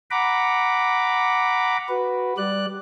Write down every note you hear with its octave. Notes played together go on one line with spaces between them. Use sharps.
F#5 A#5 B5 D6
F#4 B4
G3 D5 F#6